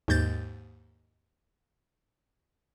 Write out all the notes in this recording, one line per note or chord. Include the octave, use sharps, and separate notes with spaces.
D#2 G#2 G6 A6